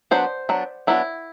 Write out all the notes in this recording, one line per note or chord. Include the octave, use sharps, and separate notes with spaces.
F#3 B3 D4 C5
F#3 B3 D4
F#3 B3 D4 E4